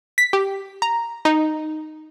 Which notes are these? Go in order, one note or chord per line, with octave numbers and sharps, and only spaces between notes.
B6
G4
A#5
D#4